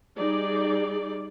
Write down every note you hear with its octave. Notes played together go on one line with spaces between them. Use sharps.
G3 D#4 G#4 D5